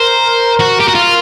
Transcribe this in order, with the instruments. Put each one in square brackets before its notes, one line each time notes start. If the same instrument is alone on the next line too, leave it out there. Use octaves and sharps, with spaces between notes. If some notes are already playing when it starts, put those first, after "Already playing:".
Already playing: [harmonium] A#4 [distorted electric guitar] C5
[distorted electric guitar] F#4
G4
F#4
F4